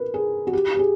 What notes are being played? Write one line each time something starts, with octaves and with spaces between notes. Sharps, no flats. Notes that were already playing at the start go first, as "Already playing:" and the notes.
Already playing: A#4 B4
G#4
F#4
G4
G4
G#4